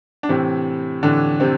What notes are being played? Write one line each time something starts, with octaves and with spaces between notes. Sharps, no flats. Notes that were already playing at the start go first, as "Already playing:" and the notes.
D4
A2 C3 E3 C4
A2 D3 E3 D4
C3 C4